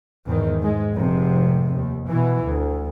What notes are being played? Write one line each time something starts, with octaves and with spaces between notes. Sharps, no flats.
E2 G#2 D#3
G#2 G#3
F1 G#2 C3
D#2
B2 E3
D2